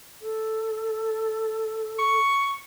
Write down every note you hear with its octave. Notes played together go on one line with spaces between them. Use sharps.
A4
C#6